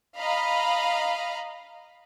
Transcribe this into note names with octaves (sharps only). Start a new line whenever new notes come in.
D#5 F5 A#5 B5